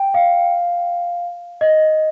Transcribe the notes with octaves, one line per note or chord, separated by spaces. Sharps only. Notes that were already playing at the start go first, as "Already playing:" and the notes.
Already playing: G5
F5
D#5